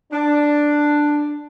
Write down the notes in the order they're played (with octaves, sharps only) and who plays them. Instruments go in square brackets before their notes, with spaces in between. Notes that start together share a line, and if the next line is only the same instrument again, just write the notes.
[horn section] D4